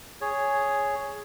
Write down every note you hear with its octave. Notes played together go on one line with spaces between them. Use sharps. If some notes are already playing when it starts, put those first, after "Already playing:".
G#4 C#5